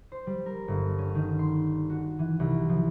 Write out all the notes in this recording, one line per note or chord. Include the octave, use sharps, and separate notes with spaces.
C5
G3
A#4
G1
C#4
D#3
C6
F#4
E3
C2
F3